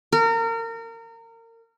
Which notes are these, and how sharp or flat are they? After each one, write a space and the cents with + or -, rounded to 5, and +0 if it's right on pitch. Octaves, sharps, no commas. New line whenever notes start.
A#4 -30